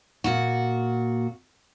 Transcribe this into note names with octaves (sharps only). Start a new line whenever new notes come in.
A#2 F#4